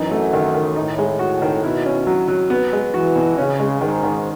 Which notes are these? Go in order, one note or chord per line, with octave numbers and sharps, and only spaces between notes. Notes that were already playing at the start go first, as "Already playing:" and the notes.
Already playing: F#2 E3 D#4
A3
D#3
D#3
A2 D#4
G#3
F#4
D#3
B2 E4
C#4
F#3
F#3
B3
G#3
E3 F#4
B2
C#3 C#4
G#3
G#2 D#3
D#3